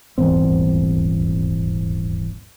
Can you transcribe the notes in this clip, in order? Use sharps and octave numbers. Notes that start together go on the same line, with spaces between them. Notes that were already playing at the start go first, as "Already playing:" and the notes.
D#1 G#1 E2 C4